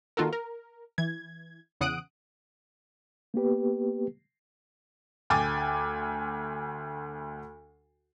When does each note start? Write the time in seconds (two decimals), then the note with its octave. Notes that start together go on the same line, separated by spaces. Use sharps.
0.17 D#3 A#3 F4 F#4 A4 A#4
0.33 A#4
0.98 E3 G#6
1.81 E2 C#3 F#5 D#6 F#6 D7
3.34 A#3 B3 G4 B4
5.30 D2 G5 G#5 D6 A6